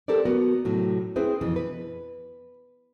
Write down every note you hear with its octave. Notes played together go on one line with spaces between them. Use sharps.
C4 G4 A4 A#4 C5 D5
B3 F#4 A#4
A2 C3 F#3
C4 E4 G#4 B4 C5
F2 B2 E3
B4